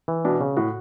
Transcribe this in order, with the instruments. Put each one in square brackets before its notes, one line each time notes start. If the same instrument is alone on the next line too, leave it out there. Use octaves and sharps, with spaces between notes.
[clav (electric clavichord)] E3
[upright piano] B2 [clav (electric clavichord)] D4
[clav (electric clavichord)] C#3
[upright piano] A2 [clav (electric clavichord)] F#4